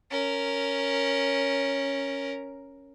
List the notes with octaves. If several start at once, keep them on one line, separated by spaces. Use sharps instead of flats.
C#4 A#4